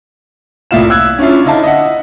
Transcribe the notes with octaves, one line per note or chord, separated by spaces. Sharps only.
C2 A2 E4 F4 F5 E7
E6 F#6 G#6
C#4 D4 E4 F4
D3 D#4 E4 F5 A5
D#5 E5 F#5